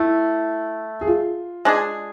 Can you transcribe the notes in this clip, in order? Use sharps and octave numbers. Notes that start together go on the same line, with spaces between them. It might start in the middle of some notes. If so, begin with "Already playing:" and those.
Already playing: A3 E4
G#4
F4
G#3 D4 G#4